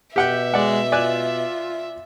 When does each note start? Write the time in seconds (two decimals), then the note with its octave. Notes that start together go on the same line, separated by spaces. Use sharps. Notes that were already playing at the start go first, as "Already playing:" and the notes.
0.16 B2 G4 E5 F#5 G5
0.54 G#3 D5 F#5
0.92 F4 D5 G#5 F#6